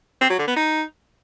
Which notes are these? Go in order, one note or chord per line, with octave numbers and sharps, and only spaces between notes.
C4
F#3
D3
B3
D#4